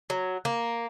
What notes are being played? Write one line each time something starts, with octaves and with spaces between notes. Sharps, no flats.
F#3
A#3